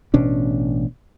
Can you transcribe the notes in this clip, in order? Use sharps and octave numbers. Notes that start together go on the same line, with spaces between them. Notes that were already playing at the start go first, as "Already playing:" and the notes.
A1 B2 C#4 D4